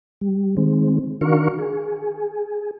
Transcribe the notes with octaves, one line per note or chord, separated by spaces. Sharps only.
G3
D#3 G#3 C4
D#3 D4 F#4 A#4 F5 C#6
G#4